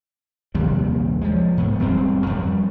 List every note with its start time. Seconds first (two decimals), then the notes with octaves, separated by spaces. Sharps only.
0.55 A#1 D#2 C3 G3
1.21 F3 G#3
1.57 G#2 B3
1.80 E1 G3 G#3 C4
2.27 F2 G3